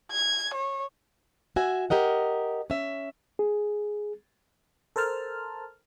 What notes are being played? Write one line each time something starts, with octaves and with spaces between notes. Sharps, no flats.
G#6
C#5
F#4 E5 G#5
G4 A#4 D#5 F#5
C#4 E5
G#4
A4 A#4 C5 A5 F6